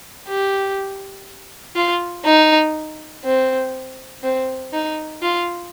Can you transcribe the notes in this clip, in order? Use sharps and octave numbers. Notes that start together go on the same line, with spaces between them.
G4
F4
D#4
C4
C4
D#4
F4